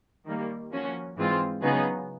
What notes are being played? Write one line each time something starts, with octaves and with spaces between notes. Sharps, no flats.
D#3 G3 A#3
F3 A#3 C#4 F#4
G#2 E3 G#3 C4 F4
C#3 F#3 B3 D#4 G#4